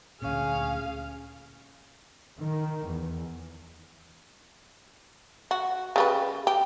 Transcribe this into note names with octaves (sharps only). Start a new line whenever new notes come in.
D2 A#2 C#4 G#4 F5
D#3
E2
F#4
C#3 G3 B4
G4